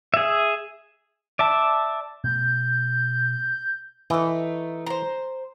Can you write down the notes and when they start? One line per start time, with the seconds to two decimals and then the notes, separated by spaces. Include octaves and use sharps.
0.14 G#4 E5
1.39 D5 E5 A5
2.24 B2 A3 G6
4.10 E3 A3 D#4
4.86 C5 A#5